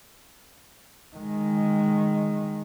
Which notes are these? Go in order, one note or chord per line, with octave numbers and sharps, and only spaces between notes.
D#3 G#3